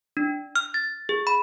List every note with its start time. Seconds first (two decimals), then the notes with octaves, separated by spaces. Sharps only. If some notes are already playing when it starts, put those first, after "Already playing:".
0.17 D4
0.56 F6
0.74 A6
1.09 G#4
1.27 B5